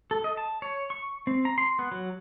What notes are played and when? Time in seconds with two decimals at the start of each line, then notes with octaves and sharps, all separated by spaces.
0.11 A4
0.24 D#5
0.37 A5
0.62 C#5
0.90 C#6
1.27 C4
1.45 A#5
1.58 C6
1.79 B3
1.92 F#3